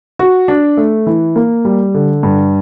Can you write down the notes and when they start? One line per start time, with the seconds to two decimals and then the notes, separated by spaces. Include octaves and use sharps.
0.19 F#4
0.48 D4
0.77 A3
1.07 E3
1.36 A#3
1.65 G3
1.94 D3
2.23 G2